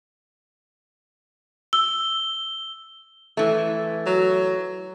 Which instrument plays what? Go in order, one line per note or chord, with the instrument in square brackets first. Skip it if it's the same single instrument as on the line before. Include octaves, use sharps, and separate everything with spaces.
[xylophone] E6 [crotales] G7
[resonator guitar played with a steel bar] E3 A3
[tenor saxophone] F#3